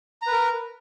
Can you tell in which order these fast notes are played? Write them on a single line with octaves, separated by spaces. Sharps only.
A#5 B4 A#4